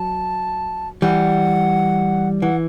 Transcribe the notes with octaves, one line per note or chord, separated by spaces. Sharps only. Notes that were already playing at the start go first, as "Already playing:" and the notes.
Already playing: F#3 A5
E3 G3 F#5
E3 F#5